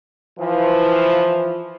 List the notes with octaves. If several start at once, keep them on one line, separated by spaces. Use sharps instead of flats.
E3 F3